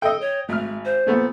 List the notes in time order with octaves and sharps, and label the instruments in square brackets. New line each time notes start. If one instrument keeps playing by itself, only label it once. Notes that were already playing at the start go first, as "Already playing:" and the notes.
[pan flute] A4 [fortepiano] D#5 G5
[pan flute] C#5
[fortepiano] G#1 F6 [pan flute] A3
[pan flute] C5
[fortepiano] A#2 A3 B3